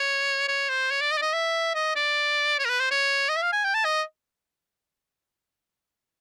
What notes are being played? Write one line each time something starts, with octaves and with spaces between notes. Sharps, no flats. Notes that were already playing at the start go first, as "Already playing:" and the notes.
Already playing: C#5
C#5
C5
C#5
D5
D#5
D5
D#5
E5
D#5
D5
C#5
A#4
B4
C5
C#5
D#5
E5
F5
G#5
G5
A5
D#5